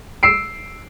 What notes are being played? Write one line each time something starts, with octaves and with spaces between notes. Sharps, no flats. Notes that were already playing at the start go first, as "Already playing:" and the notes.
E6 C7 D7